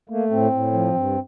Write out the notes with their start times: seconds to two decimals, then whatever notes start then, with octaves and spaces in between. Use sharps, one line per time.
0.09 A3 A#3
0.31 A2 C4
0.51 A2
0.73 F3
0.94 G2